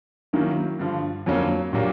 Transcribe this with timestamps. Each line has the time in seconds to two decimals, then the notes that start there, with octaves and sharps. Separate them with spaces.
0.33 D#3 F#3 A#3 C#4 E4
0.79 G2 D3 F3
1.26 F2 D3 F#3 A#3 C#4
1.73 A#2 F#3 A#3 D4 G4